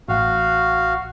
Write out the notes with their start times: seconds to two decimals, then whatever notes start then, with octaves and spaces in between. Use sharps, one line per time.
0.09 A1 F#4 F5